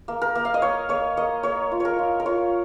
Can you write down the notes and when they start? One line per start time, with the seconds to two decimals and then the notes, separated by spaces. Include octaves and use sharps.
0.08 A#3
0.22 A#4
0.35 A#3
0.45 F5
0.54 D#5
0.62 A#3 C#5
0.89 A#3 C#5
1.17 A#3 D#5
1.43 A#3 C#5
1.72 F4
1.80 A#4 C#5
1.99 F4
2.20 A#4
2.25 F4 C#5